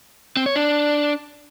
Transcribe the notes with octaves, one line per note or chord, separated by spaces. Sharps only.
C4
C#5
D4